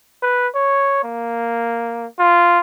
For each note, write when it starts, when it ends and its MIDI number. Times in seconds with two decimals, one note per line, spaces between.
0.23 0.48 71
0.55 0.99 73
1.04 2.06 58
2.19 2.59 65